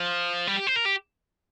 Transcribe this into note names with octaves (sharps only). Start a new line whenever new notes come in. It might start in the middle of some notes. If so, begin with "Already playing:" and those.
Already playing: F3
G3
G4
C5
A#4
G4